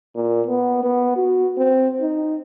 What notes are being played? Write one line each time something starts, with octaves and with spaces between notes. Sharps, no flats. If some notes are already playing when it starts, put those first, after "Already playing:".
A#2
B3
B3
F#4
C4
D#4